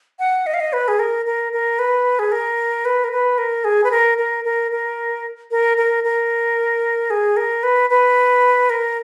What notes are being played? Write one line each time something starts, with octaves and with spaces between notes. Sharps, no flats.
F#5
D#5
F5
D#5
B4
G#4
A#4
A#4
A#4
B4
G#4
A#4
B4
A#4
B4
A#4
G#4
B4
A#4
A#4
A#4
A#4
A#4
A#4
A#4
G#4
A#4
B4
B4
A#4